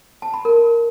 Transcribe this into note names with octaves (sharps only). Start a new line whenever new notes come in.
A5
B5
A#4